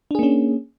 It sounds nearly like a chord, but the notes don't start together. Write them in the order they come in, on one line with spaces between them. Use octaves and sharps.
D4 G#4 A#3 C#4